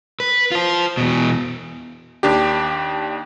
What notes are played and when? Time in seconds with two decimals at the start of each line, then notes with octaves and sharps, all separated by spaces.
0.20 B4
0.52 F4 C5
0.97 E2 B2
2.23 D#2 D4 G4